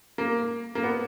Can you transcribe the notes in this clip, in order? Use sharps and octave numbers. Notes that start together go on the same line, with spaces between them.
A#3
A#3
B3